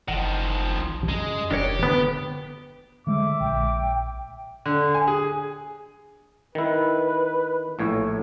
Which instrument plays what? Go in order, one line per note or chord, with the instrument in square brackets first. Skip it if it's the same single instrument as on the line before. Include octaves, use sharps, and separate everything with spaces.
[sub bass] F#1 [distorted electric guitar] D#3 F3 [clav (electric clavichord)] F#5 A#5
[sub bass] B1
[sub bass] F#2 [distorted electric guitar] G#3 [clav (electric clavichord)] A#5
[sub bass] F1 [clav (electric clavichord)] D4 A#4 C#5 [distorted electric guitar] G4
[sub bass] D3 [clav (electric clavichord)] B3
[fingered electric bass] D3 G#3 [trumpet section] E5 D6
[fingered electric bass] A#1 [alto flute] G5
[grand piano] D3
G#5
G#4
[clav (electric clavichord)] D#3 E4 [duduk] B4
[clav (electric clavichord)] A#1 A2 C#5